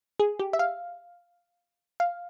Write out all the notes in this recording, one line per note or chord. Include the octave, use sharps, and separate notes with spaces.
G#4
G4
E5
F5
F5